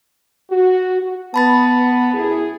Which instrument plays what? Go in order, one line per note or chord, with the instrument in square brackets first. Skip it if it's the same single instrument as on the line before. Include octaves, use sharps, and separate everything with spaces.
[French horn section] F#4
F#4
[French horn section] B3 [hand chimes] A5 B5 A6
[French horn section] F#2 E4 G#4